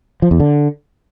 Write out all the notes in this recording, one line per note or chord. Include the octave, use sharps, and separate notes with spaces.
F3
E2
D3